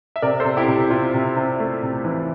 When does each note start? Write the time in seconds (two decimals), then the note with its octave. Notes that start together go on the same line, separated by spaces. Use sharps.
0.16 E5
0.22 C3 A#4 D5
0.40 A4 C5
0.45 C3
0.57 E4 G4
0.68 C3
0.90 C3 F4
1.14 C3
1.36 C3
1.60 A3
1.83 C3
2.05 E3